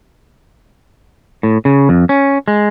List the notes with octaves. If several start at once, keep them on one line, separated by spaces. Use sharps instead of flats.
A2
C#3
F2
C#4
G#3